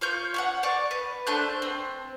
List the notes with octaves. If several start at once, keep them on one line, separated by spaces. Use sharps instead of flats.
F4 C#5 G6
C#5 F5 F#5
D5 C#6
B4
A3 D4 C5 F#6
C4